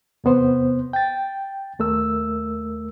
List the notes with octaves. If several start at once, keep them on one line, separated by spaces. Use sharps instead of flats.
E2 C3 B3 C5
G5 A6
D#2 A3 A#4 E6